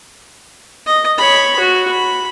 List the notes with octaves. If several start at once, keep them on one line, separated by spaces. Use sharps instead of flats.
D#5
C#5 B5
F#4
B5